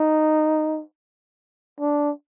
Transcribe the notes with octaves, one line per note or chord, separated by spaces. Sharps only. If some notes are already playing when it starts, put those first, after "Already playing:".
Already playing: D#4
D4